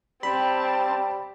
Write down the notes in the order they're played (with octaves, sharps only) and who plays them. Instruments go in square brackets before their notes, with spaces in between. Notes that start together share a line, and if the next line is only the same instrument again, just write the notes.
[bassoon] G3 [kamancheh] C4 A5 [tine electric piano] B5